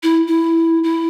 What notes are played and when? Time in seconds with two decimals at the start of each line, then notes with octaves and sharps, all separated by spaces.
0.03 E4
0.28 E4
0.84 E4